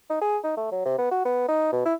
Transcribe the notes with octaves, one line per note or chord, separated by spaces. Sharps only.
D#4
G#4
D#4
A3
F#3
C3
B3
F#4
B3
D#4
B2
E4